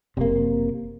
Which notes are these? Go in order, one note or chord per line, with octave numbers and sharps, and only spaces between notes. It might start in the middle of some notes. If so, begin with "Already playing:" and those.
F#1 C3 A#3